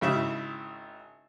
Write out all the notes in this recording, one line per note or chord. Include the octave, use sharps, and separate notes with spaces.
G#1 C#3 E4 E5